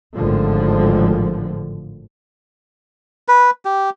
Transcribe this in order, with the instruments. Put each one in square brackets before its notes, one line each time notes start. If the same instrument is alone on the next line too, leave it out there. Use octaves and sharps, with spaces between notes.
[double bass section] G#1 A2 D3 F3
[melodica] B4
G4